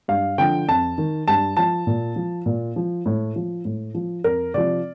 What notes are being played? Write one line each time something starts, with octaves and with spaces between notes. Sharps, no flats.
G2 F5
D3 F3 G5
F2 A5
D#3
G2 A5
F3 A5
A#2
F3
A#2
F3
A2
F3
A2
F3
F2 A#4
C3 F3 D5